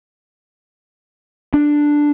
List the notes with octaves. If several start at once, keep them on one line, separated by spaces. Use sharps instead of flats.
D4